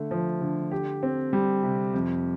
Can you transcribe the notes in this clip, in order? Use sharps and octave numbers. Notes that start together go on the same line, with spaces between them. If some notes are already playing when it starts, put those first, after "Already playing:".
Already playing: D3 A3
F3
D3
G4
C4
G3
C3
F2